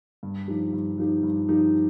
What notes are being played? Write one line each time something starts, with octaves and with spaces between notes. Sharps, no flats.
G2
F3 D#4 G4
G2
F3 D#4 G4
G2
F3 D#4 G4